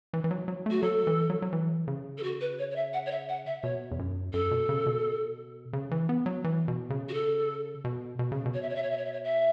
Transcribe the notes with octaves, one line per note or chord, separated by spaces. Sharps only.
E3
E3
F#3
F#3
A3 F#4
F#3 A4
E3
F#3
F#3
E3
C#3
A4
F#4
B4
C#5
C#5
E5
F#5
C#5
E5
F#5
E5
B2 C#5
E2
F#2
F#2 A4
B2
C#3
B2
C#3
E3
B3
F#3
E3
B2
C#3
F#4
A4
B2
B2
C#3
B2
C#5
E5
C#5
E5
C#5
E5
C#5
E5
C#5
E5